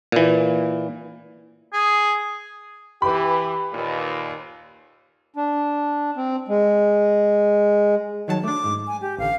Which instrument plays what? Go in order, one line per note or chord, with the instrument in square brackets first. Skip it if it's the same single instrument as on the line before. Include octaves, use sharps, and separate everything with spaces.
[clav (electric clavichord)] A#2 E3
[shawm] G#4
[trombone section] E3 G4 [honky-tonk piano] B4 B5
[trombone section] D#2 A#2
[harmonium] D4
C4
G#3
[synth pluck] D#3 F#3 A5 [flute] C#5
[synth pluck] A3 D4 [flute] D6
[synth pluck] G#2
[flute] G#5
G4
[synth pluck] A1 D3 [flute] F5